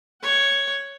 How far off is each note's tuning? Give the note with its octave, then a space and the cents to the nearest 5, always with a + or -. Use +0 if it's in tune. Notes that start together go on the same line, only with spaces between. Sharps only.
C#5 +0 F#5 +20